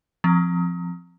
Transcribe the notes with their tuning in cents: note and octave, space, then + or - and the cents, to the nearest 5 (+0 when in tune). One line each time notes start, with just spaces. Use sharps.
F3 +0 C4 +0